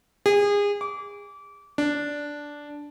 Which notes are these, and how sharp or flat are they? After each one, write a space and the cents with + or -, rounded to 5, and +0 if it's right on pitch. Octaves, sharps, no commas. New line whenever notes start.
G#4 -30
D6 -25
D4 -5